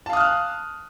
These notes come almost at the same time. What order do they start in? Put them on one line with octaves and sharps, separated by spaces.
A5 F5 D#6 F6 F#6